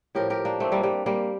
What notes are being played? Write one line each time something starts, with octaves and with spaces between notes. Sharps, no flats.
A2 F3 G4 A#4
G4 A#4
A#3 D4
A3 C4
G3 A#3
G3
G3 A#3